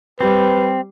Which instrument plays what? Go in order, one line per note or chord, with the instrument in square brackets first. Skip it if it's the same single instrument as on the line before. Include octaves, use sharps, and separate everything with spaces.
[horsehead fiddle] G3 [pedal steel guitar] C4 [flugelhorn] B4